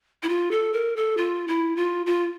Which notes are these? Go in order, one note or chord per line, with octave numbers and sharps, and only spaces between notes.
E4
F4
A4
A#4
A4
F4
E4
F4
F4